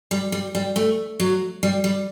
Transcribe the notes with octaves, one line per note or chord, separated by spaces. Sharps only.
G3
G3
G3
A3
F#3
G3
G3